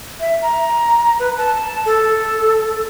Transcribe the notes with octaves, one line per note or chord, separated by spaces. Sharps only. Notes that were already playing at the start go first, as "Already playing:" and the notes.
E5
A#5
B4
A5
A4